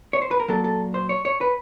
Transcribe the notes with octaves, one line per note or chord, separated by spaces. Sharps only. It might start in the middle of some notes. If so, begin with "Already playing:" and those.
C#5
C5
B4
A#4
A#2 F#3 A4
A4
C5
C#5
C#5
B4